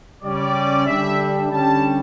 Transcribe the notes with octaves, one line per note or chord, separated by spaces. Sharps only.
C#3 G3 C#4 D5
D3 G3 D4 E5
D3 G3 C#4 A5